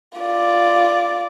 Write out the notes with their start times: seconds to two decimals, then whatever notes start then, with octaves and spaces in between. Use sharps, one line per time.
0.19 F4 D5